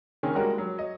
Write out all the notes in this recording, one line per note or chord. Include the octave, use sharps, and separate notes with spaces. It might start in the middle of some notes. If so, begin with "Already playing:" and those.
D#3 A#3 C4 C#4 G#4
G3 G#3 A#3 F#4 A#4
F#3
C#5 D#5